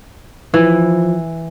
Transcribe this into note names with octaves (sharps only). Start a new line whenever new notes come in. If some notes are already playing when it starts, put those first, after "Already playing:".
E3 F3